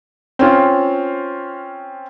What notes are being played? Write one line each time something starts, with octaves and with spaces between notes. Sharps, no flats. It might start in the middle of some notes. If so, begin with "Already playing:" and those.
C4 C#4 F4